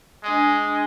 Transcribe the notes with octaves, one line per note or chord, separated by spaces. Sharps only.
G#3 D4 D#5 G#5